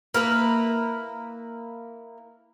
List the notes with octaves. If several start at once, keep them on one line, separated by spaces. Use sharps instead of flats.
A#3 E4 B4